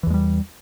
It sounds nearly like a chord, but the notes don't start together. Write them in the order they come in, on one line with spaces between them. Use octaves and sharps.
E3 E2 G#3 G3